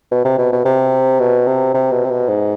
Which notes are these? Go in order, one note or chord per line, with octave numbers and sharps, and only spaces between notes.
B2
C3
B2
B2
C3
B2
C3
C3
B2
C3
B2
G#2